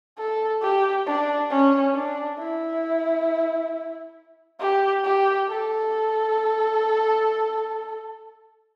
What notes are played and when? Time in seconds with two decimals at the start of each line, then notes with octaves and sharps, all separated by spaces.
0.18 A4
0.62 G4
1.06 D4
1.50 C#4
1.94 D4
2.39 E4
4.60 G4
5.04 G4
5.48 A4